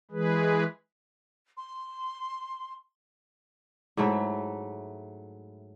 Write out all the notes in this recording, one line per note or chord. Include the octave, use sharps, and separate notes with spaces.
E3 G#3 G#4 B4
C6
G#2 F#3 A3 E4